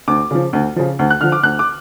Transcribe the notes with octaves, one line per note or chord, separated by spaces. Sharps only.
D2 D6
C#3 F3
D2
C#3 F3
D2
F#6
D3 F3 F6
D6
D2 F#6
D6